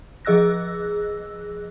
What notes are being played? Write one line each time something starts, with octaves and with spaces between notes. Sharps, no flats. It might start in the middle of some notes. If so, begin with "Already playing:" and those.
F3 G#4 D#5 E6 F#6 A#6